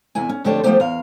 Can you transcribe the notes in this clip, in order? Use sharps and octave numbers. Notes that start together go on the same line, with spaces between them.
E2 C3 E4 G#5
C#4
F2 D3 A3 G4 C#5 A5
F3 F#3 A3 B3 G4 C5
E2 F5